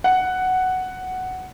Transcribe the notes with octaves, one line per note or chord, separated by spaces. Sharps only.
F#5